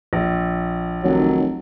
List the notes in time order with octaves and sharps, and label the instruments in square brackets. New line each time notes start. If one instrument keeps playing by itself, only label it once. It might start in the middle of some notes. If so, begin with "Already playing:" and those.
[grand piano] A#1
[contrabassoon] F1 [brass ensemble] D#3 F#3